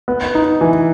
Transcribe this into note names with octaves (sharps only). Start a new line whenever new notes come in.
B3
D#4
E3